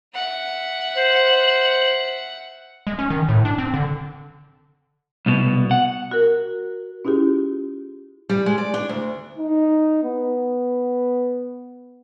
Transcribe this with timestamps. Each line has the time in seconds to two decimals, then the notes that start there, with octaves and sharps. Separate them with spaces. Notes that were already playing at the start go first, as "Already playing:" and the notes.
0.14 E5 F#5
0.96 C5 F#7
2.87 G#3
2.99 C#4
3.10 D#3
3.29 A2
3.45 D4
3.58 C4
3.74 D3
5.26 C2 B2
5.71 F#5
6.11 F#4 A#4
7.05 C#4 E4 F4 G4 G#4
8.29 G3
8.46 G#3
8.58 D5
8.74 D4
8.89 D2
9.38 D#4
10.04 B3